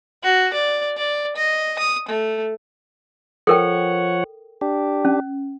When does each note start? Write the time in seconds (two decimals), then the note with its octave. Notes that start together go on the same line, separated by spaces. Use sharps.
0.23 F#4
0.54 D5
0.97 D5
1.36 D#5
1.79 D#6
2.09 A3
3.47 F3 A4 A#4 C#5 F#5 G5
4.61 D4 G4
5.05 C#4